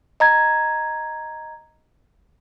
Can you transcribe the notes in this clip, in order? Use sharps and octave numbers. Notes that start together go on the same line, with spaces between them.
D#5 A#5 G#6